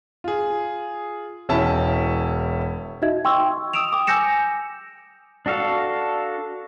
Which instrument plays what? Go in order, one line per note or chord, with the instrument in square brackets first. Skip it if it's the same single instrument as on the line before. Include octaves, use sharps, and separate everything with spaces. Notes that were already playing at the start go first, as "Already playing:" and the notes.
[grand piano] F4 G#4
E1 C#4 E4 A5
[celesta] D#4 F#4 D#5 E5 G#6
G5 C6 C#6 E6
G5
D#6 E6 D7 E7 F7
G5 D6 D#6
G#5 E6 G6 A#6 C#7 E7
[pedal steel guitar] D4 F#4 A4 F5